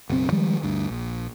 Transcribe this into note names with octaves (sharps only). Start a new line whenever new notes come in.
F#1 B1 C4
D#3 F3 G3 G#3
D2 G2
A#1